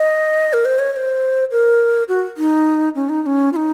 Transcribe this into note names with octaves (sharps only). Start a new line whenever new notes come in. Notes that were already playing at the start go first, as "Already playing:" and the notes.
Already playing: D#5
A#4
C5
C#5
C#5
C5
A#4
F#4
D#4
C#4
D#4
D#4
C#4
F4
D#4